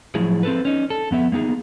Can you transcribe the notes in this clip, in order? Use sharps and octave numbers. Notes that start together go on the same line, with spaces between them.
A2 F3 F#3 E4 G#4
C4 A4 B4
C#4 D#4
A4
F2 B3 E5
A#3 B3 D#4 G#4